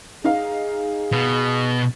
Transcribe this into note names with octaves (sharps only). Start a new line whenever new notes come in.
D#4 G#4 F5
B2